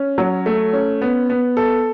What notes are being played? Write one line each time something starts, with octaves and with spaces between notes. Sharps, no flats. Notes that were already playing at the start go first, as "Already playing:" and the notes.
Already playing: C#4
F#3
A3
C#4
B3
B3
A4